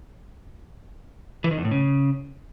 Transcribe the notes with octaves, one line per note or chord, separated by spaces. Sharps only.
E3
D#3
E2
A2
C#3